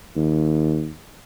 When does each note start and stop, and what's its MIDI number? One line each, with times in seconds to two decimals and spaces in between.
0.15 0.90 39